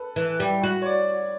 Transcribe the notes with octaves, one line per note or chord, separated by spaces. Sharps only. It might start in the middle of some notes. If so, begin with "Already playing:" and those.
Already playing: A4 B4
E3
G3
F#4
C#5
D5